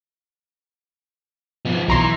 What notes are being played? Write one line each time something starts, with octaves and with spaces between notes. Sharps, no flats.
F3 B3
B1 E3 A#5 C6